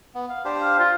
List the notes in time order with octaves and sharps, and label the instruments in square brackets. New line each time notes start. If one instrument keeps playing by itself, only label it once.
[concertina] B3
F5
D4 G4 C5
[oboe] F5
F4